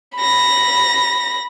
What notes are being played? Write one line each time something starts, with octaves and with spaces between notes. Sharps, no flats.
B5 A#6